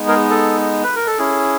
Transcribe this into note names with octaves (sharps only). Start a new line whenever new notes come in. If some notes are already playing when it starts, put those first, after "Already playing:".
Already playing: G#3 B3 D#4
G#4 A#4
A4
B4
A#4
A4
C#4 E4 G#4